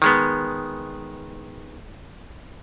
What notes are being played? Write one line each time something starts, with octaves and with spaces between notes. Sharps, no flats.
D#3 G#3 B3